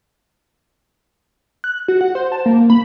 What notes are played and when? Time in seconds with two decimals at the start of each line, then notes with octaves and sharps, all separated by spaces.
1.64 F#6
1.88 F#4
2.01 F#5
2.15 C5
2.32 A5
2.46 A#3
2.70 B5